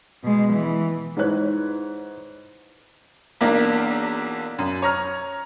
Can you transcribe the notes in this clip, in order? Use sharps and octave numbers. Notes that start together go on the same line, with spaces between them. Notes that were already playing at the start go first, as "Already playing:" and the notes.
B2 G#3
E3
G#2 D#4 E4 B4 C#5 F#6
B1 E2 A#3 D4 A#4
F#2
C#5 A#5 F6